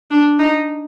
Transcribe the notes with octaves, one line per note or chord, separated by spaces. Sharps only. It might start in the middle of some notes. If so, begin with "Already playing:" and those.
D4
D#4